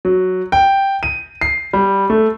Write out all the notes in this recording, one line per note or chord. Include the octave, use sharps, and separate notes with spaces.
F#3
G5
D#7
C7
G3
A3